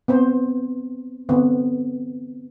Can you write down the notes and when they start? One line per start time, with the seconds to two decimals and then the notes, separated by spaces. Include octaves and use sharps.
0.08 B3 C4 C5
1.29 D3 B3 C4